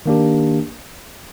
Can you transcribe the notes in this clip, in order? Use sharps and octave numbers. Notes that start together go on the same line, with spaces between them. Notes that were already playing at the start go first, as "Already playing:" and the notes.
D#3 A#3 D4 G4